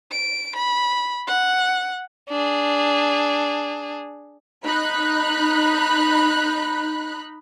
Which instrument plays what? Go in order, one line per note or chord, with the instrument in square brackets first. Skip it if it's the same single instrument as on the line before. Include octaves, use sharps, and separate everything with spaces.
[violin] D7
B5
F#5
D4 G#4
[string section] D#4 B5 F#6